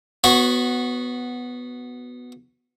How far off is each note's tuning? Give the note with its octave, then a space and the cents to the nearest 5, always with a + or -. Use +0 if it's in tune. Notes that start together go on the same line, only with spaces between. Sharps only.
B3 +0 F#4 +0 C#5 -35